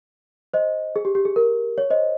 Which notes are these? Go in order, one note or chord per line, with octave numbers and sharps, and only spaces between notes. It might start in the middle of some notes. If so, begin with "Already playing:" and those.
C5 D#5
G#4
G4
G4
G#4
A#4
C#5
C5 D#5